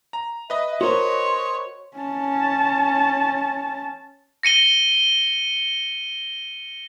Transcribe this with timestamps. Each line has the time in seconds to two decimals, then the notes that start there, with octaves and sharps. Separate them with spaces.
0.13 A#5
0.50 B4 D#5 E5
0.81 F#4 A#4 C5 C#5 C6
1.98 C#4 A5
4.43 A#6 C#7 D#7 G7